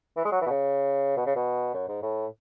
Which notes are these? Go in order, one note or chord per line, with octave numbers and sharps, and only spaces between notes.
E3
G#3
F#3
E3
B2
C#3
B2
C#3
B2
F#2
G#2
A2